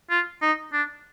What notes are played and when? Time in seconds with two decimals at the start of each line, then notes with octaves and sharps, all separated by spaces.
0.11 F4
0.42 D#4
0.73 D4